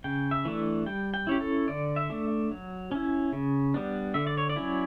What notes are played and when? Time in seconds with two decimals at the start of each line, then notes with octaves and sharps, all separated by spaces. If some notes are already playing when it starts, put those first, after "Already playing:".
0.04 C#3 G5
0.31 E5
0.45 E3 A3 D4
0.86 G3 G5
1.14 G5
1.27 C#4 E4 G4
1.40 A4
1.68 D3 D5
1.96 E5
2.10 A3 D4
2.51 F#3
2.92 C#4 E4
3.33 C#3
3.74 G3 B3 D4
4.14 D3 E5
4.27 D5
4.37 C#5
4.50 D5
4.56 F#3 C#4 E4